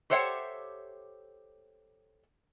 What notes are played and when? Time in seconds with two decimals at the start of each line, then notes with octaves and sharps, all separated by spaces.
0.10 G4 A4 C5 C#5 E5 F#5